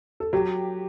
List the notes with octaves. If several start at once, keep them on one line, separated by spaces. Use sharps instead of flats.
A4
F#3 G4